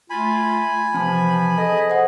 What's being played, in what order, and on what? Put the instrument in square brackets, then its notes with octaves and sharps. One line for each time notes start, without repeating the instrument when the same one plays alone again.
[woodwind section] A3 F4 [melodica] G#5 B5
[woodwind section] C3 E3 F3 [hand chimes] C4 A5
[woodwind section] G#4 D#5 [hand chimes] A4
[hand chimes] C5 F#5